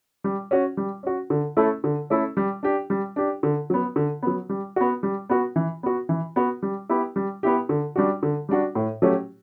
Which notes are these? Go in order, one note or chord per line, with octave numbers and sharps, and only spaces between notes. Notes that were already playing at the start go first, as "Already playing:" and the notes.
G3
C#4 F#4
G3
C#4 F#4
D3
A3 C#4 E4 A4
D3
A3 C#4 E4 A4
G3
D4 G4
G3
D4 G4
D3
F#3 B3
D3
F#3 B3
G3
B3 F#4
G3
B3 F#4
E3
B3 F#4
E3
B3 F#4
G3
B3 E4 G4
G3
B3 E4 G4
D3
G3 D4 F#4
D3
G3 D4 F#4
A2
F#3 A3 C#4 G4